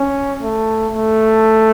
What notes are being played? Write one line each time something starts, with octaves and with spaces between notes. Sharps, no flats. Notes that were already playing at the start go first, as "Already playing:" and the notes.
Already playing: C#4
A3
A3